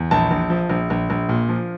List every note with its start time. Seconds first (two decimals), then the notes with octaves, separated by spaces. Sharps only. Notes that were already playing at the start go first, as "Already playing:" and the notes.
Already playing: E2
0.11 A#1 A5
0.31 A#1
0.50 F3
0.70 A#1
0.90 A#1
1.10 A#1
1.29 A#2
1.49 F3